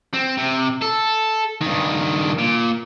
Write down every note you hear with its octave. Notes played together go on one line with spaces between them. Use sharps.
C4
C3
A4
G2 D#3
A#2